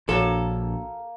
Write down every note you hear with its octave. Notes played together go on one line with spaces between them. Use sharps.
A#1 A#3 D4 F#4 A4 C#5